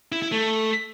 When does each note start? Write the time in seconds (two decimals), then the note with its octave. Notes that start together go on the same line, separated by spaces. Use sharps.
0.12 E4
0.22 E4
0.32 A3